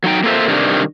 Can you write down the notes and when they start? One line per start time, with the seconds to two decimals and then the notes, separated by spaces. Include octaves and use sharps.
0.04 F#3 D#4 G5
0.24 A#3 C4 F4 A4 C5 E5
0.48 C3 D#3 G3 D4